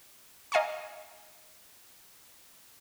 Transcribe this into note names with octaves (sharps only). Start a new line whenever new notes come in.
D#5 F5 G#5 A#5 C#6